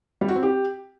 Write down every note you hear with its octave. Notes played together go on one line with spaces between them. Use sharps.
G3
F#4
C4
G4